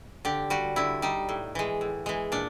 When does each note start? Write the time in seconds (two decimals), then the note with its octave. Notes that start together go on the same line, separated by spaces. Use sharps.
0.25 D3 G4
0.50 G3 F#4
0.76 D3 E4
1.02 G3 D#4
1.29 A2
1.55 E3 G#3
1.81 A2
2.06 E3 G#3
2.32 A#2 D4